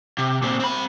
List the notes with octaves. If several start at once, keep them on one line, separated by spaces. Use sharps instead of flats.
C3
A#2 C4
C4 B5